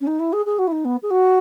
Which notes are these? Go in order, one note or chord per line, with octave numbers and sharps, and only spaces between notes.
C#4
D#4
E4
G#4
G#4
F#4
E4
D#4
B3
G#4
F#4